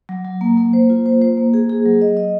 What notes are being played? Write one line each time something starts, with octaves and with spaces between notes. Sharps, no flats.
F#3
F#3
A#3
A#3
C5
F4
C5
C5
A#3
G#4
G#4
F#3
D#5
D#5